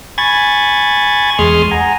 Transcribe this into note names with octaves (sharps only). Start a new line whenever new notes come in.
G#5 B5 C#6 G#6 A6
E2 G#3 C6 D#6 F6
F#5 G#5 A#5